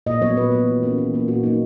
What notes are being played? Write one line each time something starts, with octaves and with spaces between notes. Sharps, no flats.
A#2 D#5
F#3 B3 C#5
A#2 B4
F#3 B3
E3
A#3 C#4
E3
A#3 C#4
A#2 F#4
F#3 A#3 D#4